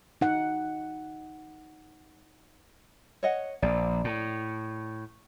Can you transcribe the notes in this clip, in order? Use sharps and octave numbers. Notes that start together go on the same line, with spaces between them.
D#4 F#5
C#5 D#5 F#5
A#1 D5
A2